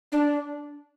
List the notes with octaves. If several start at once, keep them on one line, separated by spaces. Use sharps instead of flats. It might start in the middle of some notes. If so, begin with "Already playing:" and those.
D4